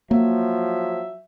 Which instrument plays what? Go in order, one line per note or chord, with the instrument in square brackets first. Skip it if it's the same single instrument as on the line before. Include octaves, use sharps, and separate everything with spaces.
[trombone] F3 [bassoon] F#3 [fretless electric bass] A#3 [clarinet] E5